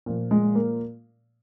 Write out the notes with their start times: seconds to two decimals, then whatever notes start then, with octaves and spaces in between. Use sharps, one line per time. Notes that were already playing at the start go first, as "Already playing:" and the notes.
0.06 A#2 F3
0.31 G#3
0.55 A#3